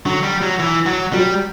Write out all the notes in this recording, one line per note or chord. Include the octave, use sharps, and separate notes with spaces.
D3 F#3
G3
F#3
E3
F#3
F#3 G3